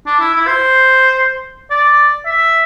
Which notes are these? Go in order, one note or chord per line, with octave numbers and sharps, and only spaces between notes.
D4
E4
E4
C5
D5
E5